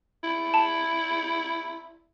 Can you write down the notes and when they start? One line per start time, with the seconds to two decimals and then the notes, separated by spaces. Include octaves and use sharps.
0.24 E4
0.54 A5